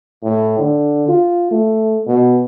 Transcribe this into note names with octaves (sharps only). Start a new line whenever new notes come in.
A2
D3
F4
A3
B2